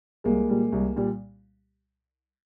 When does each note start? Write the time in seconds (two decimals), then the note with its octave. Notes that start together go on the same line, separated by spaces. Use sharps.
0.24 C2 G#3 A#3
0.49 A#2 G3
0.72 C2
0.96 A#2 G3